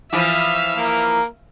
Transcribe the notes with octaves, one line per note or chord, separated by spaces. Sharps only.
E3 F3 E4 E5 F5
A#3 A#4